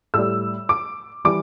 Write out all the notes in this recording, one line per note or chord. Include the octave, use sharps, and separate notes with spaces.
A2 G3 E6
D6
E3 G3 D6